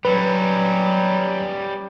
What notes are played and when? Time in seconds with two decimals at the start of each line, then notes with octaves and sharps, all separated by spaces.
0.05 F#3 G3 C#4 B4